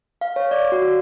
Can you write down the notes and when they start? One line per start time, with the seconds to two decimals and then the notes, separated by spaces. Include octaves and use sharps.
0.21 F5
0.36 C#5
0.51 D5
0.72 F#4